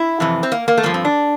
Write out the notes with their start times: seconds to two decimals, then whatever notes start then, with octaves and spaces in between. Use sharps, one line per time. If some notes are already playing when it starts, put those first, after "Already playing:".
Already playing: E4
0.20 F2 C3 E3
0.43 C4
0.52 A#3
0.68 A#3
0.78 A3
0.83 G2 F3 A#3
0.94 C4
1.05 D4